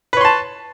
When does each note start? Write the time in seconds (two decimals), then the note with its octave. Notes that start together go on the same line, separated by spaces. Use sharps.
0.13 B4
0.17 C#5
0.21 C6
0.25 A5